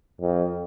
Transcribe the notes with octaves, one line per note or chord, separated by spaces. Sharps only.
F2